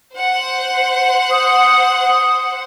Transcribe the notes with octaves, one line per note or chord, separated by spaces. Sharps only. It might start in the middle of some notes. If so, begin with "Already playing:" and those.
C5 F#5
D#6